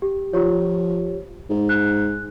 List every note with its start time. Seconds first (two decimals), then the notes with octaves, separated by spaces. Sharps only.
0.02 G4
0.33 F3 F4 G4 C#5
1.50 G#2
1.69 F#6